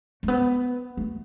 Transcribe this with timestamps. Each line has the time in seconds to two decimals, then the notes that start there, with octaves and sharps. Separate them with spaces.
0.23 A3
0.28 B3
0.97 A3